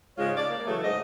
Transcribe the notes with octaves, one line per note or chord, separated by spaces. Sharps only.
G#2 C#3 G#3 F4 C#5
D5
A#3
C#3 E3 F#3 A3 A4
G#2 D#5